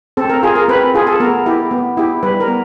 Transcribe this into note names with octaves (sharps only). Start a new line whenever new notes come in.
C4 A4
A#4
F4 G#4
A#4
C4 B4
F4 G#4
A4
B3 A#4
E4 G4
B3
E4 G4
G3 B4
A#4
B3